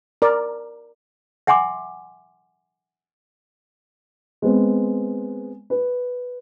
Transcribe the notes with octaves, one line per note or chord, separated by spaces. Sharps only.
A#4 D5
E5 F#5 G#5 C6 D6
G#3 B3 C4
B4